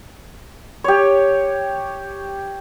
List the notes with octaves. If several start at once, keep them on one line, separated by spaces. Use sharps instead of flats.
G4 C#5